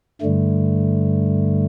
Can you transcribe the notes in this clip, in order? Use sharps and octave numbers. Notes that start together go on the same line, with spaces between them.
G2 D3 G3 A3